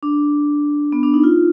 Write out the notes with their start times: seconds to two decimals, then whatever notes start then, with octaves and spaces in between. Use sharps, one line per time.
0.03 D4
0.92 B3
1.03 D4
1.14 D#4
1.24 F4